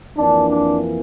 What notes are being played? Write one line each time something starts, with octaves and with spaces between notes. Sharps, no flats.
F2 E3 A#3 D4
D4